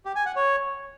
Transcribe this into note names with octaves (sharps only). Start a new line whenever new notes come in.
G4
G#5
F#5
C#5